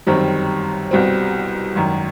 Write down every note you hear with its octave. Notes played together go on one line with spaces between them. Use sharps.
G1 F#2 D#3 G3 C4
C2 B2 G3 C4
G#1 F#2 D#3